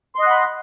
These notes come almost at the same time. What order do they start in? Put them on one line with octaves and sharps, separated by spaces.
C6 D#5 F#6 F#5 B5